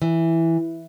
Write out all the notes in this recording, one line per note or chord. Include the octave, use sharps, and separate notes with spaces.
E3